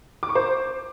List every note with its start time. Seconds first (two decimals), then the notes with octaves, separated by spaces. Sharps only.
0.23 D6
0.29 C#6
0.35 C5